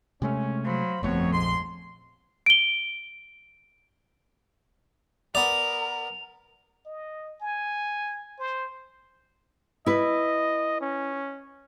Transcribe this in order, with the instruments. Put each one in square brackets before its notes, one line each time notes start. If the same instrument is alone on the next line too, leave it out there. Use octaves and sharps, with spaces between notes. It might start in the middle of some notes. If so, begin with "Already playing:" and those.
[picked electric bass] C3 G#3 A3 [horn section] C#4
[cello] F#3 [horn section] C5 F5 B5
[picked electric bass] G1 A3 B3 [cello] F2 [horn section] C4 F#4 C#5
[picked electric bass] A#1 [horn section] G#2 C6
[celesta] D7 G7
[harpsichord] B3 D5 [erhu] A#4 [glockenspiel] F7
[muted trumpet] D#5
G#5
C5
[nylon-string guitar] E4 B4 [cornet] D#5
[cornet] C#4